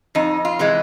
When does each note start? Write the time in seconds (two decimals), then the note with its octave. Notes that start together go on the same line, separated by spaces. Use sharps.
0.15 F2 D#4
0.45 F4
0.59 C3 E3 G#3